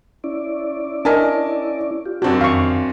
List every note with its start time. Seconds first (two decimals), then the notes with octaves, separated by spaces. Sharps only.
0.24 C#4 E4 D5
1.05 D4 A#4 D#5 G#5 A5
2.06 F4 G4
2.22 F#2 C4 D4 F#4
2.41 F2 D#3 F5 C#6